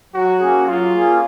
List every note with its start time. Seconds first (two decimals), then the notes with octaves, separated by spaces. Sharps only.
0.13 F#3 F#4
0.40 A#3 C#4 G#4
0.66 F#3 F4
0.94 A#3 C#4 G#4